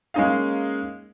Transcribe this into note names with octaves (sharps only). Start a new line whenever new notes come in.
G#3 A#3 C#4 D#4 G#4 F5